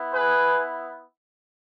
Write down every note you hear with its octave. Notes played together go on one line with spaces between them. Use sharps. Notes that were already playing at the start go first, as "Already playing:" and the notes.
Already playing: B3 E4
G#4 B4